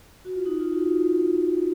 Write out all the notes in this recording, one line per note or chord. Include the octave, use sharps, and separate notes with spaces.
F#4
F4
D#4
F4
F#4
F4